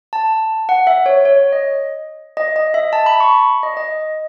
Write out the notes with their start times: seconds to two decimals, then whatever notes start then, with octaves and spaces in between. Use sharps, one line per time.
0.13 A5
0.69 F#5
0.87 E5
1.06 C#5
1.25 C#5
1.52 D#5
2.37 D#5
2.56 D#5
2.74 E5
2.93 A5
3.06 B5
3.20 C#6
3.63 D#5
3.77 D#5